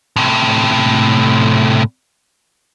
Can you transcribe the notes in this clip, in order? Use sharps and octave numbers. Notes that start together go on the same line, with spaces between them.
A2 C3